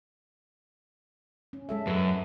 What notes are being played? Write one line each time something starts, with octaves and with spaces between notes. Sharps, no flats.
C#4
G#3 A4 E5
F#2 B4